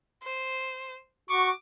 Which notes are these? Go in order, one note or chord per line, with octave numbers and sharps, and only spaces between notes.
C5
F#4 C#6 D6